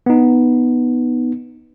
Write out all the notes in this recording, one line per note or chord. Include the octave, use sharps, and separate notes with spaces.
B3 D#4